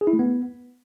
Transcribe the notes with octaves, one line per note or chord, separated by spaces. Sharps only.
G#4
E4
A3
B3